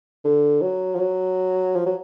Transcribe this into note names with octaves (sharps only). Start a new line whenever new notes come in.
D3
F#3
F3
F#3
F3
F#3